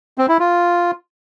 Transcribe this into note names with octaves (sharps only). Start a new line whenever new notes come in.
C4
E4
F4